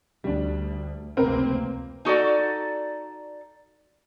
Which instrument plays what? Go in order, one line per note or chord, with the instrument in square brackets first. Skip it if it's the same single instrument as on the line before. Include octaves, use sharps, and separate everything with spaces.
[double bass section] D2 [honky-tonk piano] G3 D4
[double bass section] F1 C#2 A#3 [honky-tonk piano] C4 A#4 B4
[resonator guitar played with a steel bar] D#4 F#4 A4 D5